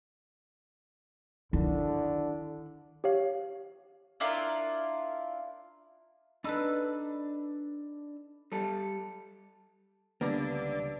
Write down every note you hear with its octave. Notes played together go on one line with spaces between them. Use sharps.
D3 D#3 E4
G4 C#5 F5
D4 E4 F4 A#4
D4 D#4 A4 B4 B5 E6
G3 A4
C#2 D3 G3 A#3 B3 D4 D5